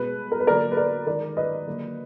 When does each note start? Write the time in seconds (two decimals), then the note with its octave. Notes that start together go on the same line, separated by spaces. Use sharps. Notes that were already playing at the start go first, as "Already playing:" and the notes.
Already playing: B2 G#3 B4
0.32 A#4
0.40 B4
0.47 D3 F#3 A#3 A#4 D5
0.71 B4
0.77 A#4 D5
1.07 D#3 G#3 A#4 D5
1.37 B4 D#5
1.67 D3 F#3 A#3